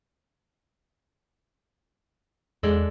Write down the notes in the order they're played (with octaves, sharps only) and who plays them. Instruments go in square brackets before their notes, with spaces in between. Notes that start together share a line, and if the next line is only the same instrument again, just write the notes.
[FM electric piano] E2 [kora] G#3 D4 A4